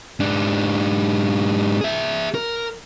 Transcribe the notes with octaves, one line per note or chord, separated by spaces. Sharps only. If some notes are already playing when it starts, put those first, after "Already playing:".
G#2 D4
G#4 E5
A#4